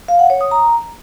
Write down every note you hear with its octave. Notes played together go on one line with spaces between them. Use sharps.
F5
F#5
C#5
D#6
A#5